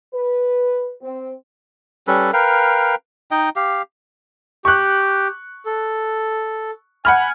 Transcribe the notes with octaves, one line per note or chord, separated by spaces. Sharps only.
B4
C4
G3 C#4 A4 B4
A#4 B4 F5 G5
D#4 D#5 G5
G4 F5
G4 C#6 F#6
A4
F#5 G#5 B5 F6